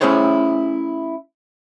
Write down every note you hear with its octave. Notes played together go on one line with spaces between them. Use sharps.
A3 C#4 E4 G#4 C5 C#5